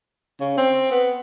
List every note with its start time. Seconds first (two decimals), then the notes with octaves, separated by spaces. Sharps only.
0.41 C#3
0.58 C4
0.91 B3